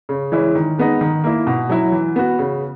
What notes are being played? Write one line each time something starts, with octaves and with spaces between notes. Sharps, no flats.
C#3
E3 G#3 C#4 E4
D#3
G#3 B3 D#4
D#3
A#3 E4
B2
F#3 C#4 E4
E3
B3 F#4
C#3